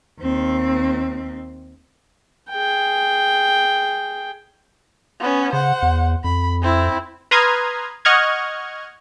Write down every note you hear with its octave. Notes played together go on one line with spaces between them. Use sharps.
D#2 C4
G#4 G5
B3 C#4
C#3 C5 F#5
E2
F2 B5
C4 E4
B4 A#5 C6 D#6 F6 G#6
D#5 F#5 C#6 F6 G#6